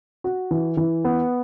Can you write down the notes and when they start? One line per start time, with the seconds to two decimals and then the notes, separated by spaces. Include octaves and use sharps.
0.24 F#4
0.51 E3
0.77 E3
1.04 B3